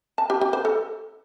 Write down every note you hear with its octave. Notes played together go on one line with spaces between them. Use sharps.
A5
G4
G4
C5
A4